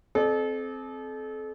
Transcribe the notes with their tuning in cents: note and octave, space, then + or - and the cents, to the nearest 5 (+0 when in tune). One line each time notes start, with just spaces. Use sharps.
C4 +0 A4 -35 D5 +45